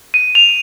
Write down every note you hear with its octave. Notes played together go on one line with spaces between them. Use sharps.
D#7
F7